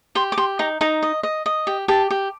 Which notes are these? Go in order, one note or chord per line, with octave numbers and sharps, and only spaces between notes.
G4 C6
D6
G4 C6
D#4 A#5
D#4 A#5
D#5
D#5
D#5
G4
G4 A5
G4